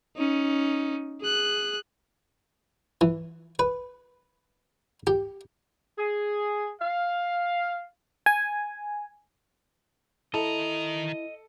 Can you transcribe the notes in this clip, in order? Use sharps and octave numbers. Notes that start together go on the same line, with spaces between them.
C#4 D#4
G#4 F#6
E3
B4
G4
G#4
F5
G#5
D#3 E4 A4 D#5 A#5